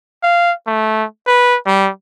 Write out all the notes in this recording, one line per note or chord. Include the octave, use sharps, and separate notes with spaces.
F5
A3
B4
G3